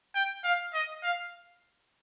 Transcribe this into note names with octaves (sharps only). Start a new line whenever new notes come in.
G5
F5
D#5
F5